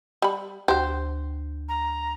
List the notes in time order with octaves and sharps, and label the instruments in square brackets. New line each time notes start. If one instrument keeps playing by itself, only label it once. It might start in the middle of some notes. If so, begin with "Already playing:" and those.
[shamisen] G3 B5
[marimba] D2 [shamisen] F#4 G4 [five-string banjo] C5
[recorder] A#5